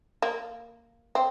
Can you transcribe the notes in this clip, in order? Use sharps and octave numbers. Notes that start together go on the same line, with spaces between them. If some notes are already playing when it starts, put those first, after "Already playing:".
A#3
C4